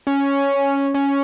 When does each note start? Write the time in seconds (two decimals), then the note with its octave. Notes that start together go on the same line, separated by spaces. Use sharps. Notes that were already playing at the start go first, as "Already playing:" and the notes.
0.07 C#4
0.94 C#4